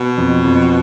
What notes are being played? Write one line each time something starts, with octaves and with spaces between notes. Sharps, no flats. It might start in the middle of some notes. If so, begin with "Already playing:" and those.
Already playing: B2
F2
F2